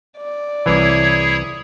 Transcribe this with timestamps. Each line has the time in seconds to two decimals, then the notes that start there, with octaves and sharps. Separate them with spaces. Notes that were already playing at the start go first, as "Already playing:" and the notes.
0.18 D5
0.66 C2 E3 E4 G#4 C#5